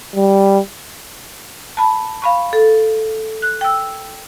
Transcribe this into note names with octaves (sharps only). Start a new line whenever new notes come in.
G3
A5 B5
F5 B5 C#6
A4
F#6
G5 E6